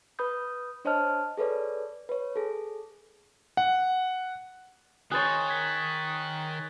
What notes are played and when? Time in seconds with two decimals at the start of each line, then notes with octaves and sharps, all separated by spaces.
0.19 B4 B5 D#6 G6
0.85 D4 C5 C#5 D#5 A5 F6
1.37 G#4 A4 B4 C#5 D5
2.09 B4 C#5
2.36 G#4 A4
3.57 F#5
5.11 D#3 G#4 C5 C#5 F#6 A6
5.49 G#6 B6